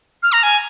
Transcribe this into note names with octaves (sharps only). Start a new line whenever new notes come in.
F6
A#5
G#5